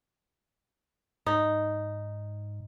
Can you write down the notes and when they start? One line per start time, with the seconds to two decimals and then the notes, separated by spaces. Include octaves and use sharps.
1.26 G#2 D#4